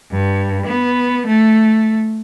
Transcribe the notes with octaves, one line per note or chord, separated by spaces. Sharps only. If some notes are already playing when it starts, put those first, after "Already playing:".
G2
B3
A3